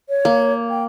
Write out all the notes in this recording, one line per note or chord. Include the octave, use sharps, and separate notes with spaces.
C#5
A#3
G5